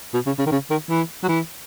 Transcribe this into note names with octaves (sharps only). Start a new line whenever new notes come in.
B2
C#3
C#3
D#3
C#3
D#3
E3
F#3
E3